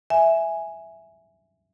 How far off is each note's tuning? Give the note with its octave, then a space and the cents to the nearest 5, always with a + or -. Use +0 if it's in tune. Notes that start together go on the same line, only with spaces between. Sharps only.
E5 +0 G#5 +0